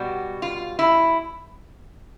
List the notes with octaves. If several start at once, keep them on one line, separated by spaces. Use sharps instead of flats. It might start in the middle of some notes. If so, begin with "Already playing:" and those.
Already playing: B2 G3 F#4
F4
E4